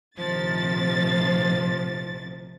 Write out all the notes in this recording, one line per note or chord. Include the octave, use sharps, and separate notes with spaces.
A#1 A2 C3 D#3 F3 A6